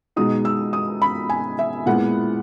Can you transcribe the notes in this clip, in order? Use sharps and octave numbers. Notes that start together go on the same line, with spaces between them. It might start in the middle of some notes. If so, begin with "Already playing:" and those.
B2 G#3 D#4 D#6
E6
D#6
B5
G#5
E5
A#2 G#3 B3 E4 F#5